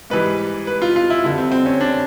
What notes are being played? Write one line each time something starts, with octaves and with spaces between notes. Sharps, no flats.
G#2 E3 G3 B4
B4
F4
F4
E4
F2 D3 G3 E4
C4
C4
C#4
D4